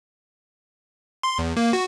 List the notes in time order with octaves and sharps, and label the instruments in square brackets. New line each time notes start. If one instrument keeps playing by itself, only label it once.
[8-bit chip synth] C6
E2
A#3
F#4